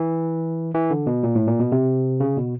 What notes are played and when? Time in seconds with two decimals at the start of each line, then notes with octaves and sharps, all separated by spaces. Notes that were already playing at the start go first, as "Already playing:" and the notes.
Already playing: E3
0.74 E3
0.90 D3
1.07 B2
1.23 A#2
1.35 A2
1.47 A#2
1.60 B2
1.72 C3
2.20 C#3
2.37 B2